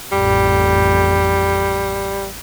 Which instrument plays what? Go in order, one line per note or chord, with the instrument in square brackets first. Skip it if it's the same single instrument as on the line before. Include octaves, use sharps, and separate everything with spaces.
[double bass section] A1 F2 [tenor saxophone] G3